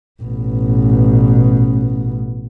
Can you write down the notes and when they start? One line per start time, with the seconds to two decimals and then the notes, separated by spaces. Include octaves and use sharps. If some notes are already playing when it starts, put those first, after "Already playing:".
0.23 A1 B2